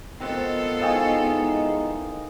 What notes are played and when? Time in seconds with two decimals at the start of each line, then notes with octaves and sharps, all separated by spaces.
0.20 D#3 B3 C4 F4 A4 F#5
0.81 E2 G#3 D#4 D#5 F5 G5 G#5 C#6